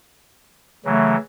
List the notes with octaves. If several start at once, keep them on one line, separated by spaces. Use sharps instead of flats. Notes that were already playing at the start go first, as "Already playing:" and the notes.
C#3 E3 F#3 A3